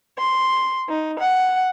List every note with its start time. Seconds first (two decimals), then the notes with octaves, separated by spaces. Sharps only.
0.18 C6
0.88 D#4
1.19 F#5